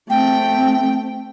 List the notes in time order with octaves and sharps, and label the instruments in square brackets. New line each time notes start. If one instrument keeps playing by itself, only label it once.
[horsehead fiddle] A3 C4 [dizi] G5